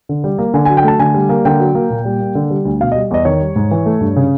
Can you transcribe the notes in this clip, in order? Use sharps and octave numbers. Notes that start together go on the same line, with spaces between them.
D3
G3
A#3
D3 G#5
G#5
F#3
G5
A3 A5
D3 G#5
G3
A#3
D3 G5
F#3
A#3
A#2
G3
A#3
D3
G3
D2
B2 F5
D#5
G3
E2 D#5
D#3 C#5
G3
G#2
E3
A3
G2
C#3